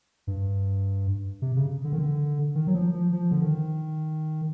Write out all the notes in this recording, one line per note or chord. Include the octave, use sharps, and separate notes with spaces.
G2
C3
C#3
D3
D#3
D3
D#3
F#3
F3
F3
F3
D3
D#3